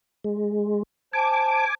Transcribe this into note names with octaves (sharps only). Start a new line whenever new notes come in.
G#3
C5 G#5 A5 D6